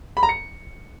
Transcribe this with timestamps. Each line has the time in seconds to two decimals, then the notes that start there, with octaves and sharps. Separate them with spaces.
0.17 B5
0.23 A#5
0.29 C#7